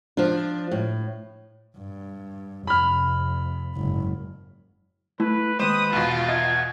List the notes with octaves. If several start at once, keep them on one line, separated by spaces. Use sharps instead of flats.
F3 D4
A2
G2
F2 C3 B5 F6
F#1 G#2
A3 E4 B4
D#2 G#3 B4 C5 D#6 E7
E2 B2 F4
D#5 E5 G#6